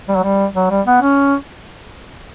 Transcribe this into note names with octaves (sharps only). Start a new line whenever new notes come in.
G3
F#3
G3
F#3
G3
B3
C#4